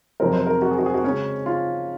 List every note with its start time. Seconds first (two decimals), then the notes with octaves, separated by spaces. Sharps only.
0.20 F2 C3 F#3 C4 A#4
0.33 C5
0.47 A#4
0.62 F#4
0.71 G#4
0.78 F#4
0.86 G#4
0.94 F#4
1.04 C#3 G#3 C#4
1.46 F4